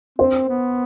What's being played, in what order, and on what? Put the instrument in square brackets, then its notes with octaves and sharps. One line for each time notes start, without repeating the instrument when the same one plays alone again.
[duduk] C4 [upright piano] C5
[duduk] B3